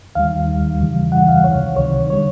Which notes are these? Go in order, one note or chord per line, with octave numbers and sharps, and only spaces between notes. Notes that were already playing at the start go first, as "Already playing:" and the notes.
D#2 D#3 G3 F5
D#2 D#3 G3
E2 C#3 E3 G3
E2 C#3 E3 G3 F#5
F5
C#2 C3 D#3 F#3 C#5
C#2 C3 D#3 F#3 C#5
D3 G3 C#5